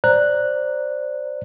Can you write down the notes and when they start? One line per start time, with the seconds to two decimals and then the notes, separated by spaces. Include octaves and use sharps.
0.04 C5 D5 A#5 F#6